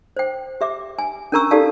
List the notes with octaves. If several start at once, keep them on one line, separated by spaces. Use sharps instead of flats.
C5 G5
G4 E5 D6
G#5
C#4 D4 A#4 A#5 C#6 E6
D#4 G4 A4 D5 F5 A5